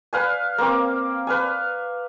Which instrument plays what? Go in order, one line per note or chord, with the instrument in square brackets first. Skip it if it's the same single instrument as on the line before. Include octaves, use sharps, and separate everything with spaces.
[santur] B4 F5 G#5
A#3 C4 D6
B4 F5 G#5